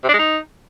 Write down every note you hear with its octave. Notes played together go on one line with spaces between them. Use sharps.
C3
D4
G#3
D#4